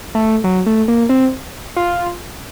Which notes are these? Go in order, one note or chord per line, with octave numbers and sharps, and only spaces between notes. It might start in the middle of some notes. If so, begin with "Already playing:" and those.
A3
F#3
A3
A#3
C4
F4